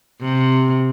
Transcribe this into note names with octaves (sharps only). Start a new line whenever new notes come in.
C3